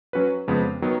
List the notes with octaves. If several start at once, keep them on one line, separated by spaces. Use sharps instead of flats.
F#3 C#4 F#4 B4
F2 C#3 G#3 B3
D#3 F#3 B3